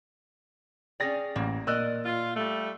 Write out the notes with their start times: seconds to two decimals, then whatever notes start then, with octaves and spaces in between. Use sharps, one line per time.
1.00 C#4 G#4 D5 G5 A#6
1.36 A1 A#3
1.67 A#2 A#4 D5 D#5 E6 F#6
2.05 F4
2.36 G3 A3